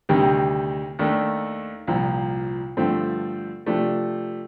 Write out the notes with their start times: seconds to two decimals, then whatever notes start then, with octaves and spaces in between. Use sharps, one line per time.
0.09 D2 C3 D#3 G3
0.99 D#2 D#3 A3 D4
1.87 C2 A#2 F3
2.77 G2 D3 F3 A3 C4
3.66 C3 F3 A3 D4